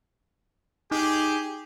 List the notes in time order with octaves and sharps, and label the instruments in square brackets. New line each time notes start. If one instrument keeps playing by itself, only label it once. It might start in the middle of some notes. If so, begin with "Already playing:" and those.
[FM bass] D#4 [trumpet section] G4 G#4